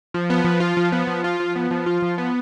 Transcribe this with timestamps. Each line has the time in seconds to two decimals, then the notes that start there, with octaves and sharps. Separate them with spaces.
0.14 F3
0.30 B3
0.44 F3
0.60 F4
0.77 F3
0.92 B3
1.07 F3
1.24 F4
1.40 F3
1.56 B3
1.71 F3
1.86 F4
2.02 F3
2.18 B3